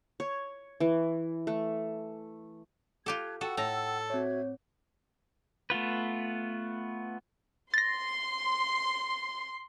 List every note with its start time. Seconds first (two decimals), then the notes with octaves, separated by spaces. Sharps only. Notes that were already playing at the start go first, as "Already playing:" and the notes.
0.20 C#5
0.80 E3
1.47 A3
3.06 F4 G4 A4 A5 F#6 G#6
3.41 F#4 A4 F#5 G5 E6
3.57 A2 A4 A#5
4.10 C4 F#4 C#5 E5 G#6
5.70 A3 B3 F4 B4
7.74 C6 A6 A#6